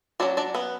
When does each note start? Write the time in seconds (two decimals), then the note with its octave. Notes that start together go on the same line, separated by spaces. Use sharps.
0.20 F#3 C#4 D4 D5
0.37 D4 D5
0.55 B3 B4